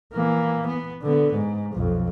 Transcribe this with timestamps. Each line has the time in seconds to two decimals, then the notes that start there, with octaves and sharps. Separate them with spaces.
0.13 E3 A#3
0.67 B3
1.02 D3 B3
1.34 G#2
1.73 B1 F2